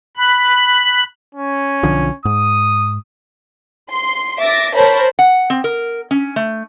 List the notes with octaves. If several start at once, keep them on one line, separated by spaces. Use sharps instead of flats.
B5 F#6
C#4
B1 D3 F3
G#2 D#6
C6
E5 D6 A6 A#6
A#4 C5 C#5 A5 B5
F#5
C4
A#4
C#4
A3